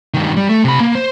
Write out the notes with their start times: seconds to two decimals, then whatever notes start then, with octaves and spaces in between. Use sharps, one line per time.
0.14 G2 D#3
0.37 G3
0.49 A3
0.65 C3 B5
0.80 A#3
0.95 C5